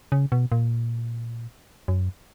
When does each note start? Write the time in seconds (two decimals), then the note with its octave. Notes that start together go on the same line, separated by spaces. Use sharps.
0.12 C#3
0.32 B2
0.52 A#2
1.88 F#2